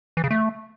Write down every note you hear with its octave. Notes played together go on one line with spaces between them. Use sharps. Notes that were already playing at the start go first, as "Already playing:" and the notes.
E3
C#3
A3